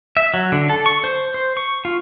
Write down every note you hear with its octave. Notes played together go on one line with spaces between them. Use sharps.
E5
F#3
D3
A4
C#6
C5
C5
C#6
F4